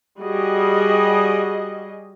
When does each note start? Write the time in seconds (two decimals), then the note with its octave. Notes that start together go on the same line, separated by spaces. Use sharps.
0.19 G3 F#4 G#4 D#5